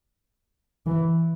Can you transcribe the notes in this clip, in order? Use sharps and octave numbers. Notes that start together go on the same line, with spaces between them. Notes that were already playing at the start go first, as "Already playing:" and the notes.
E3